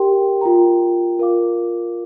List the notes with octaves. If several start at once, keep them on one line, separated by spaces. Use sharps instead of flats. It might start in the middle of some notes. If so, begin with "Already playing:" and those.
Already playing: G4 A#4 G5 C6
F4 A#4 G5 A#5
F4 A#4 F5 D6